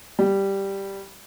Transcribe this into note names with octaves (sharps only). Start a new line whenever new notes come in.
G3